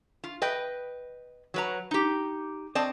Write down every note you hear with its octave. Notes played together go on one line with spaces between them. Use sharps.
F4
B4 D#5 G5
F#3 B4 A#5
D#4 G4
C4 D5 D#5 A5